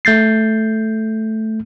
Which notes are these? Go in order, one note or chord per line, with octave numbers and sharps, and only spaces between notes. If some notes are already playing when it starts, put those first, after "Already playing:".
A3 G6 A6 C7